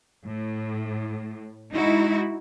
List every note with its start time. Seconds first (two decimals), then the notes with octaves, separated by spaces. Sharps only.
0.25 A2
1.74 G#3 D#4 E4 F#4